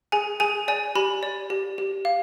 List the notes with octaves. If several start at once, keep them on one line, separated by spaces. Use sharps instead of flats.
G#4 G#5
G#4 G#5
D5 G#5
G4 B5
D5
G4
G4
F5